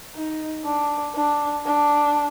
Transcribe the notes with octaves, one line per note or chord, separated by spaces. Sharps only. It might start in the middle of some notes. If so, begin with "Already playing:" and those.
D#4
D4
D4
D4